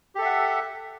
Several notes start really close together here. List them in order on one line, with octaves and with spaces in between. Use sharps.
G4 A4 E5 F#5